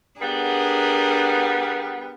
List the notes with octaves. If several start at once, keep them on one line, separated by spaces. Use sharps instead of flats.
G3 B3 D4 G#4 A#4